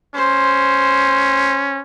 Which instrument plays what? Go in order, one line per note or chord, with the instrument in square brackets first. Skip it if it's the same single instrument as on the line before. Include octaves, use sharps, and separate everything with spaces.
[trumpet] C#4 [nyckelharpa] C5